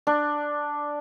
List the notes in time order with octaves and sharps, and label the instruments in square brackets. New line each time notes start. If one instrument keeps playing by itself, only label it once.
[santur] D4